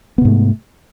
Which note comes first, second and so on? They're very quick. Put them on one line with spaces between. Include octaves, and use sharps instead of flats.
B3 C3 G#2 A3